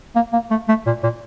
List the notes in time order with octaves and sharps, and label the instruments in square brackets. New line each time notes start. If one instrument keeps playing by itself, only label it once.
[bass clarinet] A#3
A#3
A3
A3
A#2
A#2